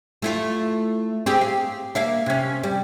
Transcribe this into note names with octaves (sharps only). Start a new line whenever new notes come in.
A3 E4 F4
C4 G4 G#4
F5
A#3 E5 F5
C3 C#4
G3